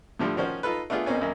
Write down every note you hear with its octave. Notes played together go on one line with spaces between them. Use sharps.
A2 D3 F3 G3
D#3 F3 C#4 F#4 C5
D#4 F4 A4 B4
A3 B3 D4 F4 G#4
B1 B2 A#3 C4 C#4 G#5
B1 F#2 A#3